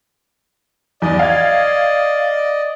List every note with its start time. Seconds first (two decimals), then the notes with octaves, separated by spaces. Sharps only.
1.02 E2 D5 D#5
1.19 F5 G#6